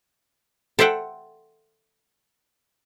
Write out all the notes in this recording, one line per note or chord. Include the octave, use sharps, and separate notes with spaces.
A4 C5 E5 F#5 G5